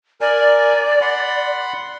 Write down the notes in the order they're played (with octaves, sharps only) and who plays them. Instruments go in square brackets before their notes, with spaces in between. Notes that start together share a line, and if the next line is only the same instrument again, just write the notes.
[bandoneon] A#4 G#5 [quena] D5
[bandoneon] F#5 B5 C6